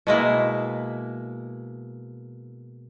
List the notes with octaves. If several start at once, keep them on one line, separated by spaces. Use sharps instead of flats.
B2 G#3 A#3 E4